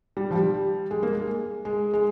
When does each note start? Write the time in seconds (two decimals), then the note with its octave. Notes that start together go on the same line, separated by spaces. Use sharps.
0.17 G3
0.31 F3
0.35 G3
0.91 G#3
1.03 A#3
1.13 G#3
1.65 G#3
1.94 G#3